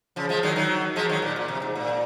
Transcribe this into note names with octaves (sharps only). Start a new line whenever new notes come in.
C#3 F3
F3 G#3
D#3 F#3
D#3 F#3
F3 G#3
D#3 F#3
A#2
A#2
C3
G#2
A#2